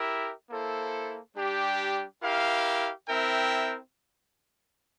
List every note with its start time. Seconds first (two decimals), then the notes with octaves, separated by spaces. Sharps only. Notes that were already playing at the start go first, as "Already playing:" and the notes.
Already playing: E4 G4 A#4 E5
0.50 A#3 E4 A4 C5
1.36 G3 D4 G4
2.22 E4 G4 A#4 F5
3.08 C4 E4 A#4 E5 G5